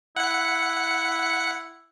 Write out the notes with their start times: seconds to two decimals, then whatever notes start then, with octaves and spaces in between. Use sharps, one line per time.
0.17 E4 F#5 C#7